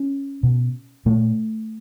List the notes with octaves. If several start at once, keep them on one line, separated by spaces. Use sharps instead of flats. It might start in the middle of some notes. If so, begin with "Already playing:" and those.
Already playing: C#4
B2
A#2 A3